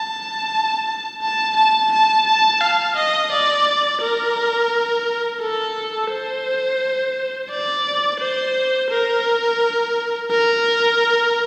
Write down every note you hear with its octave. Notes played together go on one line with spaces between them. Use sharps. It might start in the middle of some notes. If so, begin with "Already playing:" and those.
Already playing: A5
A5
A5
A5
A5
F5
D#5
D5
A#4
A4
C5
D5
C5
A#4
A#4